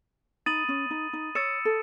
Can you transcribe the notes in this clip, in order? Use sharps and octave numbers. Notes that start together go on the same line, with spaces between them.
D#4 B5 D#6 A6 D#7 F#7
C#4
D#4
D#4
C#5 E6 A6 C#7 E7
A4